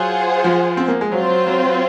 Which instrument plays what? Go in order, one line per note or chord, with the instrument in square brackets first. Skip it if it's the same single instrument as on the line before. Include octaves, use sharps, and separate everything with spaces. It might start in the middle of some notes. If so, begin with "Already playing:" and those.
Already playing: [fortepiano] F#3 [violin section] F4 G#4 C5 F#5
[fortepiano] F3
C4
A#3
G#3
[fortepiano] F#3 [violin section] C4 F4 C5
[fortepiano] F#3
F#3
F#3